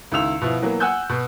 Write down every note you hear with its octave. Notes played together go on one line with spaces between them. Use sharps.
C#2 D#3 E4 E6 F7
B2 F3 E4
E3 F#3 A#3 B3
F#5 G#5 E6 F#6 G6
B2